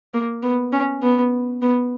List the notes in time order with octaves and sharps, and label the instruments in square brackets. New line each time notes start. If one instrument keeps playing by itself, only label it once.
[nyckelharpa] A#3
B3
C#4
B3
B3